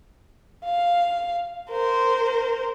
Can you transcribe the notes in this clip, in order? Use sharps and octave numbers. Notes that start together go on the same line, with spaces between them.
F5
A#4 C5